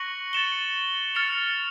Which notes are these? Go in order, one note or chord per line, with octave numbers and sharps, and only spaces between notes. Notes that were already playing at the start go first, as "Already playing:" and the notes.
Already playing: C#6 F#6 A#6 C#7 F#7
A6 C#7 E7 G7
F6 A6 C#7 F7